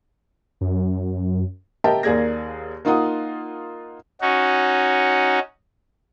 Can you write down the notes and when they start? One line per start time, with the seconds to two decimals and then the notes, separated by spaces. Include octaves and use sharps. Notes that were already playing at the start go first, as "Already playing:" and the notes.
0.61 F#2
1.84 G4 A#4 D#5 E5 G5 A5
2.03 D#2 A#3 G#4 D5 G#6 A#6
2.85 A#3 D#4 F4 F#5 D#6
4.21 C#4 D#4 F#4